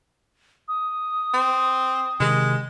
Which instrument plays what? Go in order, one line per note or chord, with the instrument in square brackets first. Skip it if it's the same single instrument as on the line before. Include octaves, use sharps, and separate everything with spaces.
[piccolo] D#6
[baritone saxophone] C4
[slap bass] C3 D#3 [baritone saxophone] G#3